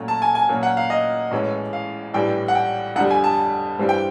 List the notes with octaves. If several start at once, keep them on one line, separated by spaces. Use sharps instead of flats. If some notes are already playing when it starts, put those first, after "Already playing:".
Already playing: A#2 F#3 A3 C#4
A5
G#5
G#5
A#2 F#3 A#3 C#4 F#4
F#5
F5
D#5
A1 A2 E3 G#3 C#4
F5
A#1 A2 E3 G3 G5
F#5
G5
F2 D3 G3 F#5
G#5
A5
G2 E3 G3 C4
G5